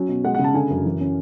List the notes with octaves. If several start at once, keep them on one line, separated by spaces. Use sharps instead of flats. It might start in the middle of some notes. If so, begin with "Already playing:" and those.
Already playing: F#3 C#4
B2
G#3 F#5
F#5
C#3
A5
D3 G#5
F#2
E3
C#4